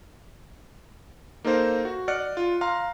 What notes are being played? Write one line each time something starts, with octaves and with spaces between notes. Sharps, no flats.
A#3 D#4 A4 A#4 C5 F5
F#4
D5 D#5 F#5 F6 F#6 C#7
F4
F5 A#5 C6 F6